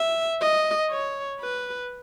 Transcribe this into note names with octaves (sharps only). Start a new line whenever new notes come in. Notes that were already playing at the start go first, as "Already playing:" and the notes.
Already playing: E5
D#5
C#5
B4